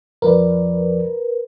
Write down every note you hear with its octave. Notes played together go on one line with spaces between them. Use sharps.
F2 F3 A#4 B4 D5